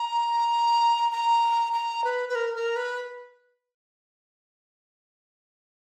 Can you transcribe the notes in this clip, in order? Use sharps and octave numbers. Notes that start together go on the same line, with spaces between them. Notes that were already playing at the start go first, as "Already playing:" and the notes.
Already playing: A#5
A#5
A#5
B4
B4
A#4
A#4
B4